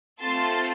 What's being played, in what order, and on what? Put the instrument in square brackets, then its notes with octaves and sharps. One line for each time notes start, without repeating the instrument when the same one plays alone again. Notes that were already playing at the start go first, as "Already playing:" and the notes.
[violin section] A3 C4 F4 A4 A5 C6